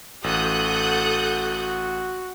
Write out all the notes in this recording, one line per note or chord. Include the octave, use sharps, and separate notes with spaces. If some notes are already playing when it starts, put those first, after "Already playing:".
A1 F#4 A4 D#6 F#6 G6